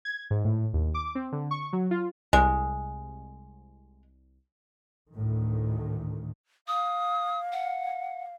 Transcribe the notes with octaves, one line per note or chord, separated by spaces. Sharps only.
G#6
G#2
A2
D#2
D6
C4
D3
C#6
F#3
F4
C2 G#3
D2 A2 D#3
F5 D#6
F#5